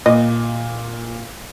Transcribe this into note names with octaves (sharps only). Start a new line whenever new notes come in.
A#2 D#5